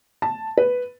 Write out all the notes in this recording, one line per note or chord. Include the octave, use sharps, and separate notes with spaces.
A5
B4